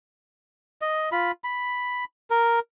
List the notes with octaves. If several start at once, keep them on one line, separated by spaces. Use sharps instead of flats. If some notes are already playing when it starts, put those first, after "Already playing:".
D#5
F4 B5
B5
A#4